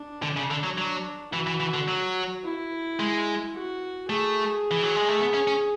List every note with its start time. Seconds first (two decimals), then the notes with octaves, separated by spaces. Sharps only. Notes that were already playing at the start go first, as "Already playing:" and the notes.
Already playing: D4
0.22 D3
0.37 C#3
0.51 D3
0.63 F#3
0.78 F#3 D4
1.33 E3 F#4
1.47 E3
1.60 E3
1.74 D3
1.88 F#3
2.44 E4
3.00 G#3
3.55 F#4
4.09 A3 G#4
4.71 E3
4.83 F#3
4.96 G#3
5.09 A3
5.20 B3
5.34 C#4
5.47 C#4